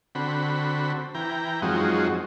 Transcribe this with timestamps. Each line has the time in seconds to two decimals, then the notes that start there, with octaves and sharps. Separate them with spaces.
0.15 D3 C4 F#4 B5
1.15 E3 G5 A#5
1.62 F#2 F3 G#3 C4 D#4 F#4